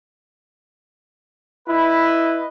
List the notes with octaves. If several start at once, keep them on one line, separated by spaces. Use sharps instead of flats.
E4 B4 D#5